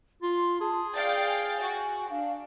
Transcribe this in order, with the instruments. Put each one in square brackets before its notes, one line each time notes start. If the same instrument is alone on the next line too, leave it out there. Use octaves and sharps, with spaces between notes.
[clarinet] F4 [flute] C6
[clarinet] G#4 [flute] A5
[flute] D5 [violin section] F5 G5 A6
[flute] G#5
[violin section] F#4
[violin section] D4 [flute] F5